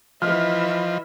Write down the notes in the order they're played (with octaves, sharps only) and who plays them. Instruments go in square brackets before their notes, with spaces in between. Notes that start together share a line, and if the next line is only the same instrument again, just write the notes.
[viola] E3 E5 [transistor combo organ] F3 [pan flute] D#5 [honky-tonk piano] F6